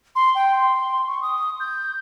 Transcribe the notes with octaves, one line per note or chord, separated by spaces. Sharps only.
C6
G5
C6
C#6
D#6
G6